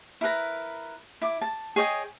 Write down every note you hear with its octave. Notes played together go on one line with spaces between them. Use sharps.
E4 A#4 B4 A#5
E4 D6
A5
G#4 C#5 D#5 G5